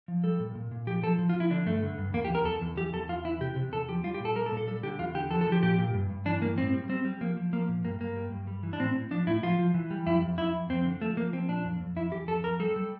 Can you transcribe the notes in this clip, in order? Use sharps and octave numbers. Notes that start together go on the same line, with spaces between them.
F3
G3 A4
A#2
A#2
A#2
F3 G4
F3 A4
F3
F4
F3
E4
D3 D4
G2 A3
D3
G2
E2 A#3
G4
E2 A#4
E2 A4
E2
E3 G4
E2 A4
E2 F4
E3 E4
C3 G4
C3
E2 A4
F3 G4
G3 F4
G4
A#2
A4
G3 A#4
A4
A#2
A4
G3 A4
D3 G4
E2 F4
D3 G4
F3 A4
A4
F3
G4
A#2 G4
A#2
G2
G2
E3 D4
G2 A#3
A2 C4
G3
G3 C4
G3
F3 A#3
F3
F3 A#3
A#2
G2 A#3
G2 A#3
G3
G2
G3
E3
D4
A2 C4
A2
F3 D4
A2 E4
F3 F4
F3
E3
G3
F2 E4
F2
F2 E4
F2
F2 C4
D3
F3 A3
F3 A#3
F3 C4
A#2 D4
F2
F2
F2 E4
E3 G4
F2 A4
F2 A#4
G3 A4
G3